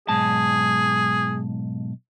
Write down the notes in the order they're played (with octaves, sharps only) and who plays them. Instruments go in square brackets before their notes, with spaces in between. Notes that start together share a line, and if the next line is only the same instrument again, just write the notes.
[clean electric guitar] B1 G#2 A5 [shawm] G#4